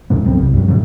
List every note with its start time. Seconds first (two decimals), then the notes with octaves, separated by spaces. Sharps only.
0.10 C#2 G#2 B2 B3
0.25 D#2 F#3 C4
0.39 C2
0.54 G2 F#3
0.68 A2 C#3 F#3